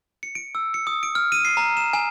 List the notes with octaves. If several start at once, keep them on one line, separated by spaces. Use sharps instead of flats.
C#7
D7
E6
C#7
D#6
D7
F6
D#7
C7
A#5
E7
G#5